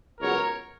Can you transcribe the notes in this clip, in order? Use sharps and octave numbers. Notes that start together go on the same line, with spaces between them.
C#2 B2 F#3 B3 A#4 C#5